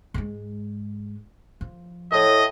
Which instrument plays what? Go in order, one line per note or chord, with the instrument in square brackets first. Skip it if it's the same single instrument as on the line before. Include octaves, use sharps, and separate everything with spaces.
[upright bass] G#2 G#3
F3
[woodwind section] A2 [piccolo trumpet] D#5